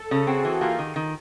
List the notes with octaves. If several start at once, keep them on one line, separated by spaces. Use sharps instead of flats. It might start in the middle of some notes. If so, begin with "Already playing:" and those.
Already playing: A4
C#3
C4 F#4 G#4
E3
A#3 F4 G4
D#3
D#3